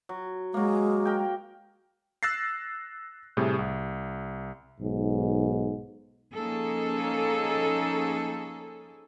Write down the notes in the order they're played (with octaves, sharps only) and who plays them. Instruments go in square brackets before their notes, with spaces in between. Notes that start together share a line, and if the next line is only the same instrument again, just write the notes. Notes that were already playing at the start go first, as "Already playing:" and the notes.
[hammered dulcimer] F#3
[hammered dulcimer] F#3 A#3 [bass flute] G#3
[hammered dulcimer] A#4 G5
[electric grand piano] E6 F#6 A6 A#6 C7
A2 C3 G3 G#4
C2
[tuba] B1 [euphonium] G#2
[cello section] F3 A#3 C#4 D#4 G#4 A4